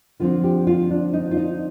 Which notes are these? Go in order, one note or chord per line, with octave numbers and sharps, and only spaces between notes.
D3 F3 C4 F4
G4
F4
D4
D#4
F4
D#4